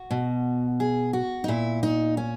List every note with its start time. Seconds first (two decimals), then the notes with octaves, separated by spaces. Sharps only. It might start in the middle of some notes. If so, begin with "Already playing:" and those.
Already playing: F#4
0.11 B2
0.80 G#4
1.13 F#4
1.44 D#4
1.48 A#2 E4
1.83 D#4
2.17 C#4